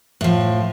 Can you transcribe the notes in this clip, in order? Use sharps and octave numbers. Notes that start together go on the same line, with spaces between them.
A2 F3